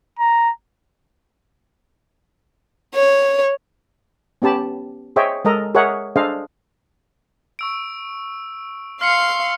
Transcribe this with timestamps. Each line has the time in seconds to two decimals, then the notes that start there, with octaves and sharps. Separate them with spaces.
0.19 A#5
2.95 C#5
4.42 B3 C#4 G4 A5 B5
5.16 G#4 C5 C#5 D#5 E5 G5
5.45 G#3 A4 A#4 D#5 A#5
5.75 G#4 A#4 C#5 D#5 E5 F#5
6.16 D4 G#4 A4 C5 D#5 F5
7.59 C#6 E6 D7
9.01 F5 C6 F6 C7 C#7